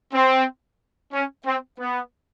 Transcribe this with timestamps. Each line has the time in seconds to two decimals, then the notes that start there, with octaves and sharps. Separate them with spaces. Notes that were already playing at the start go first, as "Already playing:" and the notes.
0.13 C4
1.12 C#4
1.45 C4
1.79 B3